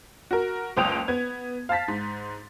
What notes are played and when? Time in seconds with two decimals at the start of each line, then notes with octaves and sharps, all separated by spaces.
0.31 F#4 A#4
0.77 F#1 C#2 G5 D#6 D7 F7
1.08 B3 G#6
1.69 F5 A5 A6 B6
1.88 G#2